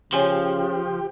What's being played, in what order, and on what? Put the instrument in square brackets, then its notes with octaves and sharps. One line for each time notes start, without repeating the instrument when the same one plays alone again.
[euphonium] C#3 [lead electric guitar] F3 [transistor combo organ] G4 [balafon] C#5 G#5 C6